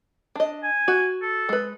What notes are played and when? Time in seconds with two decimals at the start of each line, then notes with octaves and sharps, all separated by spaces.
0.36 D4 D#5
0.63 G#5
0.88 F#4
1.22 A4
1.49 G#3 B4